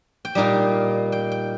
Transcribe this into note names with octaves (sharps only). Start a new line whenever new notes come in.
G5
A#2 G3 D#4 F5
G5
G5